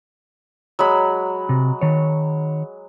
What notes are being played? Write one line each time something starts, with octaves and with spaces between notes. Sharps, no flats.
F#3 G#3 B5
C3
D#3 C#5